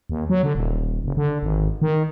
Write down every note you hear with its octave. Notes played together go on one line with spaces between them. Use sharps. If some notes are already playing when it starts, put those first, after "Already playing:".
D#2
F#3
D3
D#1
F#1
D3
G#1
D#3